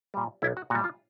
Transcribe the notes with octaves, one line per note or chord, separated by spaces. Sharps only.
A#2 G3
B1 E4
F#4
A#2 G3 F#4
F4